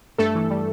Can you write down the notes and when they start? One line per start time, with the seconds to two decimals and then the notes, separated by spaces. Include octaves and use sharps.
0.18 G2 A3 A4
0.35 E3
0.50 G3